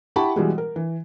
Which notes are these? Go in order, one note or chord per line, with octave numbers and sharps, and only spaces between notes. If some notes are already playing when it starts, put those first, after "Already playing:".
E4 G4 F#5 A5 B5 C#6
B2 E3 G3 G#3
A#4
E3